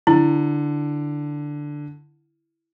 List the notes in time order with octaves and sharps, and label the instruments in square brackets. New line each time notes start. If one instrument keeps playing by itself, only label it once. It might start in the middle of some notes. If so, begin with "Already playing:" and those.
[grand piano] D3 [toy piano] E4